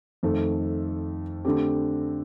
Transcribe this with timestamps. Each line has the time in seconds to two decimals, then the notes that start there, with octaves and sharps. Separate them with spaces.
0.23 F2 D#3 A3
1.45 D3 A3 C4 G4